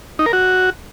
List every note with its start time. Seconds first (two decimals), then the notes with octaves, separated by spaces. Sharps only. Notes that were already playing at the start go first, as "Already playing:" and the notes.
0.19 D#4
0.26 A#4
0.33 F#4